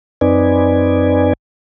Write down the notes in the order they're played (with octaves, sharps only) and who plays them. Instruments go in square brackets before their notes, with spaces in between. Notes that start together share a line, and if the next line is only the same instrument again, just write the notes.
[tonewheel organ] F#2 C4 D#4 B4 D5 G#5